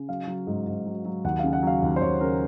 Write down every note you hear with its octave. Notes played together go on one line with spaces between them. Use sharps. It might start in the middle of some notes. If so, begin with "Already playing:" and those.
Already playing: C#3
F#3 F5
F#3
G#2
G#2
F#3
F#3
D#2 F#5
C#3 F5
F#5
F#3 F5
D#2
C5
D#2 C#5
C#3 A#4